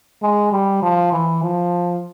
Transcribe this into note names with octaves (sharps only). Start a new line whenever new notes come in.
G#3
G3
F3
E3
F3